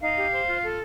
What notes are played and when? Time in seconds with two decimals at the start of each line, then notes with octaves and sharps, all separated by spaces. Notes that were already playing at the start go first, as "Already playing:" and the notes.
0.01 D#4 F5
0.17 G4
0.32 C5
0.48 F4
0.63 A4